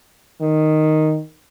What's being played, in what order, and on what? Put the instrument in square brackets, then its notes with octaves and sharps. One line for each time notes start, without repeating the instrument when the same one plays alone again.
[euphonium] D#3